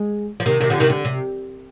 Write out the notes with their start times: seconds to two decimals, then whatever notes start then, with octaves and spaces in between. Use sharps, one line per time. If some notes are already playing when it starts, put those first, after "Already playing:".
Already playing: G#3
0.40 F3
0.46 C3 D#3
0.60 C3 D#3
0.70 D3 F3
0.80 C3 D#3
0.90 D3
1.05 C3